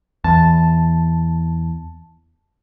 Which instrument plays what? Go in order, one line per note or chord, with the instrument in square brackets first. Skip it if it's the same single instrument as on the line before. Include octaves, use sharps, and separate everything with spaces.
[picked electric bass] E2 [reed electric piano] A5